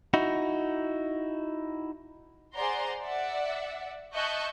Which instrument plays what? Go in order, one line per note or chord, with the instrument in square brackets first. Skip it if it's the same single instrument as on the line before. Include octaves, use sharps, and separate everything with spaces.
[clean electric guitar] D#4 E4 F#4
[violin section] G#4 C5 D5 F#5 A#5 C6
D5 E5 F#5
D#5 E5 A5 C#6 F#6 G6